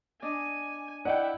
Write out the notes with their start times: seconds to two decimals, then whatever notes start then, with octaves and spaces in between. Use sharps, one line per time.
0.22 D4 D5 D#5 G#5
1.05 E4 D5 D#5 F#5 G5